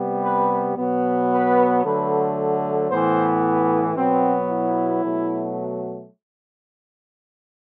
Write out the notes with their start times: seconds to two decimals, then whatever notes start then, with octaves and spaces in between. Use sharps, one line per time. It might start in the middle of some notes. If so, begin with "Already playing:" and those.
Already playing: C3 G3 B3
0.24 B4
0.77 B2 F#3 B3
1.31 B4
1.84 D3 F#3 A3 B4
2.90 A2 E3 B3 C5
3.96 B2 F#3 B3 C4
4.49 E4
5.03 B2 F#3 A3